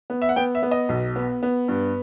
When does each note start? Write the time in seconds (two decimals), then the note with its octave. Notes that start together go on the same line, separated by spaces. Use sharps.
0.10 B3
0.22 E5
0.29 F#5
0.36 B3 G5
0.55 E5
0.63 B3
0.71 D#5
0.89 B1
1.16 B3
1.43 B3
1.68 G2